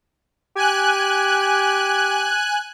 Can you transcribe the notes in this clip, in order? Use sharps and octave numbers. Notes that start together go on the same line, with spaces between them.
G4 G#5 F#6